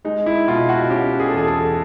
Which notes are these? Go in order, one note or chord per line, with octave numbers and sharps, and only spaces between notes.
G#3 D#4
E4
B2 F4
F#4
C#4 G4
G#4
A4
E2 G#4
A4